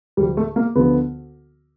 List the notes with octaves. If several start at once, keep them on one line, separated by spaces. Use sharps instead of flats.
D2 D3 F3 G3
A3
A#3
D2 D3 F3 B3